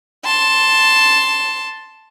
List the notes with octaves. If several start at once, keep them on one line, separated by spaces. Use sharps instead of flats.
A5 C6